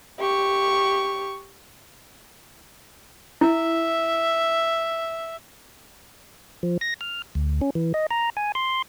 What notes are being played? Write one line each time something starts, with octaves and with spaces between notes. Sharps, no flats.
G4 C#6
E4 E5
F3
A#6
F6
D2
C#4
E3
D#5
A#5
G#5
C6